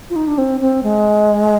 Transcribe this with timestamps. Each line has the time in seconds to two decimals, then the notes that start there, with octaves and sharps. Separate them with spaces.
0.10 F4
0.16 D#4
0.28 D4
0.38 C4
0.60 C4
0.83 G#3